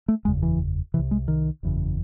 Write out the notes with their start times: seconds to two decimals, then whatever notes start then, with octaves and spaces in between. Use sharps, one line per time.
0.08 A3
0.25 F#1 E2 C#3 G#3
0.42 E3
0.94 C3 E3
0.99 C2
1.11 G#3
1.28 D#3
1.63 F#1 E2 C#3